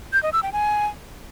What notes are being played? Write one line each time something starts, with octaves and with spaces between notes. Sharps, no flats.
G6
D#5
E6
G5
G#5